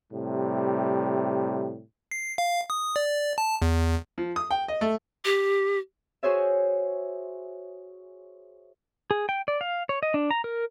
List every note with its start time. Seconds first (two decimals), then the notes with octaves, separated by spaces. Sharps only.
0.12 A2 C3 G3
2.11 C7
2.38 F5
2.70 D#6
2.96 D5
3.38 A5
3.62 E2
4.18 F3
4.36 D#6
4.51 G5
4.68 D#5
4.81 A3
5.25 G4
6.23 F#4 G#4 C5 C#5 E5
9.11 G#4
9.29 G5
9.48 D5
9.61 F5
9.89 C#5
10.03 D#5
10.14 D4
10.31 A#5
10.44 A#4